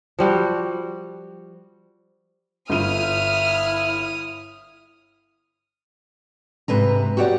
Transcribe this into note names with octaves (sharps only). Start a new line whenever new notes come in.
F3 G3 F#4
G1 E4 D#6 F6 D#7
G#2 C3 B4 A#5
F#4 G4 C#5 D5 F#5